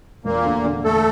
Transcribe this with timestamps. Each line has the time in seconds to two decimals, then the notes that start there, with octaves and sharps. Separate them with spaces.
0.24 E1 A#2 A#3
0.44 D2
0.65 D3
0.84 E1 A3 A4